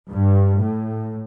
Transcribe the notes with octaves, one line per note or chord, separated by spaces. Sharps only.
G2
A2